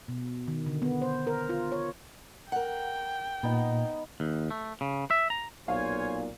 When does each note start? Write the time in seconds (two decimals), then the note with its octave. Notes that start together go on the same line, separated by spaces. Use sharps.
0.08 B2
0.48 D#3
0.66 D3
0.82 B3
1.01 C5
1.27 A#4
1.49 F4
1.72 C#5
2.52 A#4 F#5 G5
3.43 A#2 B3 D#4
4.20 D#2
4.51 A3
4.81 C#3
5.11 E5
5.30 A#5
5.68 B1 A#2 C5 C#5 F5 G#5